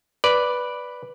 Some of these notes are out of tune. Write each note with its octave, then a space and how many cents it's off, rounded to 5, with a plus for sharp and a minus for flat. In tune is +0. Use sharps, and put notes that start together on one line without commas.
B4 +0 D5 +0